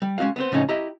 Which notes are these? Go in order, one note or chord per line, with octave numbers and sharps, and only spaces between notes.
G3
G#3 C#4 D#4 F#4 F5
B3 C4 C5
A2 C#3 F3 C#4 D#4
E4 G4 D#5 A#5